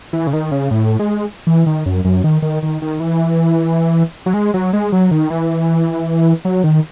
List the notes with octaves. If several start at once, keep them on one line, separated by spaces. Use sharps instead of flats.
E3
C#3
D#3
C#3
A2
G#3
E3
D#3
F#2
F#2
D#3
D#3
D#3
D#3
E3
F#3
G#3
F#3
G#3
F#3
D#3
E3
F#3
D#3